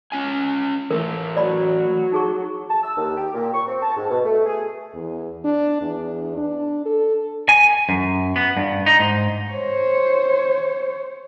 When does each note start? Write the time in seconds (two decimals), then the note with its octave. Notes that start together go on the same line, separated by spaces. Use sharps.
0.12 C#4 F4 G#5
0.90 E3 A3 A#4
1.37 F#3 D5 B5
2.12 D#4 G#4 C#6
2.70 A5
2.83 E6
2.97 D#2
3.17 G4
3.34 A#2
3.53 C#6
3.67 C4
3.83 A5
3.96 G#2
4.10 B2
4.25 A3
4.46 G#4
4.95 E2
5.44 D4
5.82 E2
6.37 D4
6.86 A4
7.49 G#5
7.89 F#2
8.36 B3
8.57 G2
8.86 D#4
9.00 G#2
9.51 C5 C#5